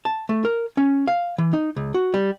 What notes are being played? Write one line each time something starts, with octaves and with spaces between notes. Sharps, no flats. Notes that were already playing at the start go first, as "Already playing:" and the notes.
A5
A3
A#4
C#4
F5
E3
D#4
C#2
F#4
G3